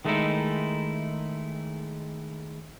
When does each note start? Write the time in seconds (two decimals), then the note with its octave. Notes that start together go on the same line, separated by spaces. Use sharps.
0.05 D#3 G#3 A3 C#4 D#4 E4